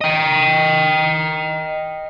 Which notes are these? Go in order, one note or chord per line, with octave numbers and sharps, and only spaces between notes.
D#5 G5